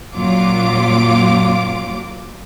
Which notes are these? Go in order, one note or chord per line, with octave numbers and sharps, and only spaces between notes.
F#2 A#2 F#3 F4 D6